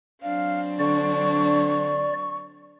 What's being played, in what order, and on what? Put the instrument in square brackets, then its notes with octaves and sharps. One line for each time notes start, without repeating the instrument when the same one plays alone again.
[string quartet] F#3 C4 D4 [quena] F5
[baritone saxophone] D3 [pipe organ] D5 [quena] C#6